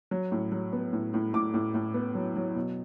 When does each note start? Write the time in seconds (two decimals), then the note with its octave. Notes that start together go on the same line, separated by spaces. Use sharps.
0.11 F#3
0.32 A2
0.52 F#3
0.73 B3
0.93 A2
1.14 A2
1.33 A2 D6
1.54 A2
1.74 A2
1.94 B3
2.15 F#3
2.36 F#3
2.55 B2